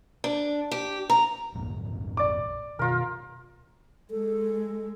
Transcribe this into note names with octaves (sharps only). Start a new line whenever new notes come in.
D4
G4
A#5
A#1 F2 G#2
D5 D6
B2 D#3 F4 A#4
G#3 A4